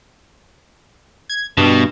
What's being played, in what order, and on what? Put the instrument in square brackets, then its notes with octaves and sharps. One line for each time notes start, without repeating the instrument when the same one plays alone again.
[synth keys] G#6
[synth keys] G2 [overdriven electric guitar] B2